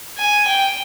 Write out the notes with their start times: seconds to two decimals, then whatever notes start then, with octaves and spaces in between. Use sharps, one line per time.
0.18 G#5
0.48 G5